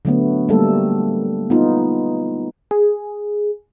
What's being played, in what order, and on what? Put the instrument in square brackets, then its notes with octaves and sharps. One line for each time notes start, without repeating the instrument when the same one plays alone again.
[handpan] D3 F#3 A3 B3
G3 A3 A#3 A4
B3 D#4 F4
[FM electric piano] G#4